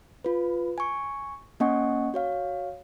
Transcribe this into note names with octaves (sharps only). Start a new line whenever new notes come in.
F4 B4
G#5 C#6
A#3 C#4 D#5 F#5 G#5 C#6
F#4 C#5 F5